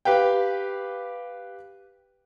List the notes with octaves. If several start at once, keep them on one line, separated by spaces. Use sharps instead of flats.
G4 B4 F5 G5